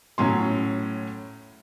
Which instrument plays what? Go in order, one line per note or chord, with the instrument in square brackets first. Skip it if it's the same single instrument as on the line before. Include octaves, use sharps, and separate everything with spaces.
[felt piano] A2 F#3 C#4 C6